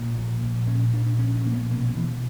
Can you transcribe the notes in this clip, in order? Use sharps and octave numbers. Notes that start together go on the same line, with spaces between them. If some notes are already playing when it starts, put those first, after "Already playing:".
Already playing: A#2
A#1
A#1
A#2 C#4
A#2 D4
A#1 C#4
C#4
A#1 A#3
B3
B2 A#3
B2 E3